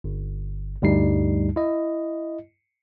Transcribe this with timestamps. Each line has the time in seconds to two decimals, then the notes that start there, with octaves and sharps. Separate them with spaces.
0.04 G1
0.82 D2 G2 G3 D#4 C7
1.56 E4 D#5